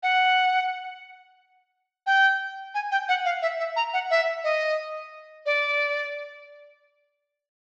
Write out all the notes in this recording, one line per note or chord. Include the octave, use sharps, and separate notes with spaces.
F#5
G5
G#5
G5
F#5
F5
E5
E5
A#5
F#5
E5
D#5
D5